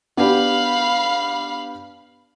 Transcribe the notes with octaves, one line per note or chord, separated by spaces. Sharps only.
B3 D4 G4 F5 B5